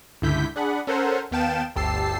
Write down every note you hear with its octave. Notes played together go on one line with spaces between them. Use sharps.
C#2 G2 D3 E4 G6 B6
D4 G#4 F#5 B5
C#4 A4 A#4 C5 F#5
D#2 B3 F5 G5 A5 E7
G1 D2 G4 A5 E6 C7